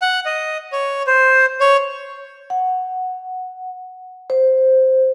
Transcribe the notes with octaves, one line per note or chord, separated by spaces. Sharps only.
F#5
D#5
C#5
C5
C#5
F#5
C5